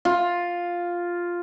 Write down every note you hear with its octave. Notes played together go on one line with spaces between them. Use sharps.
F4